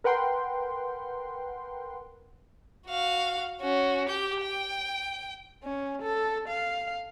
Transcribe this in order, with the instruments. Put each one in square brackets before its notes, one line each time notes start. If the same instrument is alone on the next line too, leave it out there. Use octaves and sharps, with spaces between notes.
[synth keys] A#4 B4 F#5 G5 C6
[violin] F#4 F5
C#4 F#4
G4 G6
G5
[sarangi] C#4
A4
F5